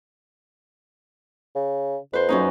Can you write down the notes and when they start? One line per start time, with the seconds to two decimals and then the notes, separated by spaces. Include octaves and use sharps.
1.56 C#3
2.13 F2 B4 C5
2.29 F#2 C#4 D#4